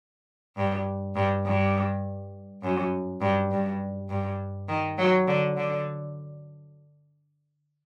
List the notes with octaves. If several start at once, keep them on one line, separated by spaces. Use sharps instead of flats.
G2
G2
G2
F#2
G2
G2
G2
D#3
F#3
D3
D3